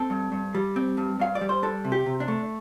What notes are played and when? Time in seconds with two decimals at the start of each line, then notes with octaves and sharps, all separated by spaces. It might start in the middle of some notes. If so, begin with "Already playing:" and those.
Already playing: C4 A4
0.10 G2
0.32 G2
0.55 G3
0.76 C4
0.97 G2
1.19 G2 F5
1.35 D5
1.41 G3
1.49 C5
1.62 D4 A4
1.85 C3
1.92 G4
2.06 C3
2.20 D4
2.28 A3